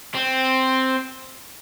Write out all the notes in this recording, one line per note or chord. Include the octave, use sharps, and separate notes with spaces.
C4